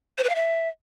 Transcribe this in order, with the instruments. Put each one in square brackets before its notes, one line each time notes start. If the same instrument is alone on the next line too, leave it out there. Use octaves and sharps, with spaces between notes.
[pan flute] C5
B4
F5
E5